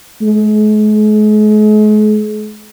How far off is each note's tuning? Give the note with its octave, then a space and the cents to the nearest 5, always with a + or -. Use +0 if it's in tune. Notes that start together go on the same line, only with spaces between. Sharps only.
G#3 +45